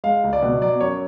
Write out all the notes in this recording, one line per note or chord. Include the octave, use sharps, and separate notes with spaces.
G#3 F5
C#2
D5
B2
F#3 D5
F#2 C#5